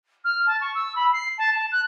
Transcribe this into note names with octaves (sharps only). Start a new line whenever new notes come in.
F6
A5
C#6
E6
B5
C7
A5
A5
F#6